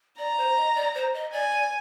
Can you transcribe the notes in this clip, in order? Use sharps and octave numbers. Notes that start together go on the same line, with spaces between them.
D5 A#5
C5
D#5
D5
C5
D#5
D5 G#5
D5